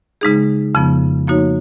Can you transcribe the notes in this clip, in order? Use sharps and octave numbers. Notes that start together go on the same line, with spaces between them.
C#3 G#3 D#4 G#4
F2 C#3 F3 B3
F3 A#3 D#4 F#4 C#5